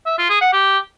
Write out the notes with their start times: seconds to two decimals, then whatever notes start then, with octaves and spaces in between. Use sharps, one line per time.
0.06 E5
0.18 F4
0.30 G#4
0.41 F#5
0.53 G4